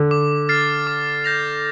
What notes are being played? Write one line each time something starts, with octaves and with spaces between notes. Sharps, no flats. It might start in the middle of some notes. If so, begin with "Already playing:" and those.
Already playing: D3
D6
F6 A6 C7
D6
G6 A#6 F7